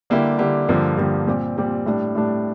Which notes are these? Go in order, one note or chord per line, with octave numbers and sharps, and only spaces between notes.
D3 G3 A#3 E4 G4
D3 G3 A#3 E4 G4
G2 D3 F3 A#3
G2 D3 F3 A#3
A#2 G3 C4 G4
A#2 G3 C4 G4
A2 G3 D4
A2 G3 D4